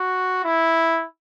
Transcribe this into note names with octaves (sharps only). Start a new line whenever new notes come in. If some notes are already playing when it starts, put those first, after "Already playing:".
Already playing: F#4
E4